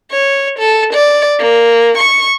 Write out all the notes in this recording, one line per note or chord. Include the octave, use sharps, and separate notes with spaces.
C#5
A4
D5
A#3
C#6